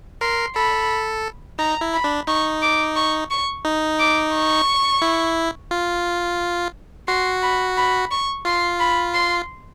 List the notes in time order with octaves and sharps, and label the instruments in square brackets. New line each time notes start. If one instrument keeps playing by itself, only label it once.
[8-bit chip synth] A#4 [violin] C6
[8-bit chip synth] A4 [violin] B5
[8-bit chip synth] D#4 [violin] A#5
[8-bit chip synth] E4
[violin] B5
[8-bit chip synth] D4
[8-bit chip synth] D#4 [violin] C#6
[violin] D6
C#6
C#6
[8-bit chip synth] D#4
[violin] D6
C#6
[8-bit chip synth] E4
F4
[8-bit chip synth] F#4 [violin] C6
[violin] B5
B5
C#6
[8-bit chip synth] F4 [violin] C6
[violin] B5
C6